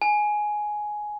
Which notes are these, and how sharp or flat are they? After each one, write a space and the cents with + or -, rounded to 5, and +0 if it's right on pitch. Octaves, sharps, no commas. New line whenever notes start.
G#5 +10